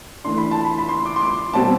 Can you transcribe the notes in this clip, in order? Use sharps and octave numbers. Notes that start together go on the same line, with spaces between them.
E3 A3 D4 C6
B5
A5
B5
B5
C6
D6
C6
D6
B2 G3 C4 A5